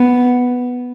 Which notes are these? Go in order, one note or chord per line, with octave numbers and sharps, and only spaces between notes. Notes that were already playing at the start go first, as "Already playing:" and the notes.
Already playing: B3